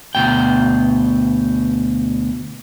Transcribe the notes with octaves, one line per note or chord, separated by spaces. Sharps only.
D2 B2 G5